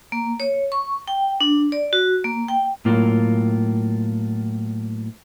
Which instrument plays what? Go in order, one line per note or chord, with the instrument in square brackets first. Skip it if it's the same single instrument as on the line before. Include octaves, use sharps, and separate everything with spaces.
[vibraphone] A#3
C#5
C#6
G5
D4
D5
F#4
A#3
G5
[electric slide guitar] A2 F#3 A#3 F4